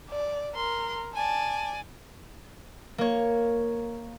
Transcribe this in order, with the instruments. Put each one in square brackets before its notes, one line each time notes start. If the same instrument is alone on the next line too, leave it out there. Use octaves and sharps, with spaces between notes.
[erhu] D5
[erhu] A#4 [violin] C6
[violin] D5 G#5 [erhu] A5
[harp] A#3 C#5